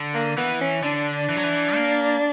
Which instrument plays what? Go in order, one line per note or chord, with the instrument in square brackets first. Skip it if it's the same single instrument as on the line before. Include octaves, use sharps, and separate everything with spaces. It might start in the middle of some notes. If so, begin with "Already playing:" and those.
Already playing: [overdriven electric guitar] D3
[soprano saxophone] A#3
[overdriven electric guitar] E3 [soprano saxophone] B3
[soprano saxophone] C#4
[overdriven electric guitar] D3 [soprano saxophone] D4
[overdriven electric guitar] E3
F#3
E3
A#3